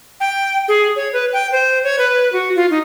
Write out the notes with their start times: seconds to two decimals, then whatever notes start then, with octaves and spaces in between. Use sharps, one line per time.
0.20 G5
0.68 G#4
0.96 C#5
1.13 B4
1.33 G5
1.52 C5
1.84 C#5
1.99 B4
2.33 F#4
2.56 F4
2.71 D#4